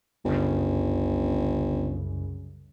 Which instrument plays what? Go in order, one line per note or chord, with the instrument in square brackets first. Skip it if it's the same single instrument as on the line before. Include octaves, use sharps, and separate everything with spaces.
[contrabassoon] G1 [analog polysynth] C2 F#2 C#3